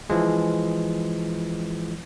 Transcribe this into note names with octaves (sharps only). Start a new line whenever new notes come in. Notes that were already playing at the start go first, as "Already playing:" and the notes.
E3 F3 G#3